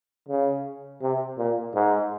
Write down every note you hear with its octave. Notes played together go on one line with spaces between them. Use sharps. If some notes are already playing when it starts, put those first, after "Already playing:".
C#3
C3
A#2
G#2